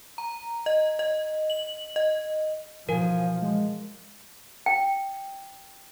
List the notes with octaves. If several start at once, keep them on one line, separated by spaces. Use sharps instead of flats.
A#5
D#5
D#5
F#7
D#5
B2 E3 F3 A#4 G#5
G#3
G5